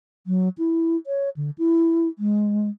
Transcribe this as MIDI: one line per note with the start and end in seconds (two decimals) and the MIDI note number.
0.27 0.49 54
0.58 0.96 64
1.07 1.29 73
1.37 1.50 50
1.58 2.08 64
2.19 2.69 56